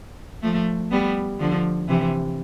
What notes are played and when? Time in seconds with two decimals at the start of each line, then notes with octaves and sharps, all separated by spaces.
0.43 F3 A3
0.91 G3 B3
1.40 D3 F3
1.88 C3 E3